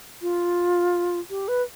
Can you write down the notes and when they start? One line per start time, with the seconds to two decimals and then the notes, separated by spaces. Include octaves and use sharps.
0.22 F4
1.30 G4
1.48 B4